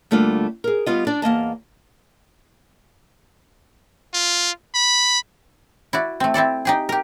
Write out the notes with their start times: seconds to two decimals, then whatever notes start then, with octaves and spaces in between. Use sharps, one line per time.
0.11 D2 G3 A3 A#3 D4 F4
0.64 G#4 A#4
0.86 G3 B3 F4 D#5
1.07 D4 D5
1.22 E2 A#3 D#5 A5
4.14 F4
4.74 B5
5.93 E4 F#4 D5
6.20 A3 C4
6.34 C4 E4 A4 D5
6.65 D#4 G4 G#4
6.89 G4 A#4